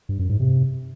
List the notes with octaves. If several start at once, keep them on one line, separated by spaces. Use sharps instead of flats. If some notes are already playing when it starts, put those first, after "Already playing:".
G2
F#2
G#2
C3